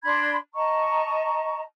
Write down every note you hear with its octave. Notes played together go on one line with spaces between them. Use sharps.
D4 B5 C6 G#6
D#5 A5 A#5 C#6